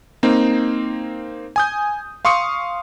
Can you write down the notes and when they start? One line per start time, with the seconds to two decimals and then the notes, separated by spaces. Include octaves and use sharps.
0.23 A#3 C4 D#4
1.56 G#5 D#6 G6
2.25 F5 C6 C#6 D#6 C#7